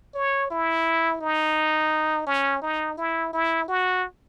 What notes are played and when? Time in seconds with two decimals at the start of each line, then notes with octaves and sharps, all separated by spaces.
0.15 C#5
0.51 E4
1.21 D#4
2.27 C#4
2.62 D#4
2.97 E4
3.33 E4
3.68 F#4